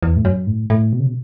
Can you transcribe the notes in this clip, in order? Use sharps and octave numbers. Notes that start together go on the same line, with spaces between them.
E2
A2
F#2
A2
A2
B2
C#3
B2